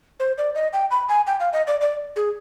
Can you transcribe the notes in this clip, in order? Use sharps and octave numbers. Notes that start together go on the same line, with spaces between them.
C5
D5
D#5
G5
B5
G#5
G5
F5
D#5
D5
D5
G#4